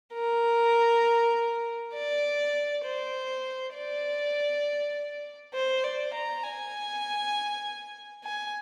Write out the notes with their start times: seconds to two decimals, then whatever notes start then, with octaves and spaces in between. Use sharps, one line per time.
0.14 A#4
1.94 D5
2.85 C5
3.74 D5
5.54 C5
5.84 D5
6.14 A#5
6.44 G#5
8.24 G#5